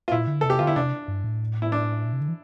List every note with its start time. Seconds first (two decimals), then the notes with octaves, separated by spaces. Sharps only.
0.08 F4
0.12 A#2 E4
0.27 D3
0.41 C3 A4
0.50 G4
0.59 D3 F4
0.67 E4
0.76 C3 D4
1.08 G2
1.24 A2
1.62 E4
1.72 D4
2.05 A#2
2.13 C3
2.21 D3
2.28 E3